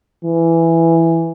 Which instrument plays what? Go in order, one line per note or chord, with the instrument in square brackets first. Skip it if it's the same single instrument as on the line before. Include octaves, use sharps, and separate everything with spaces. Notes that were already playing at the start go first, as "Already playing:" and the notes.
[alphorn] E3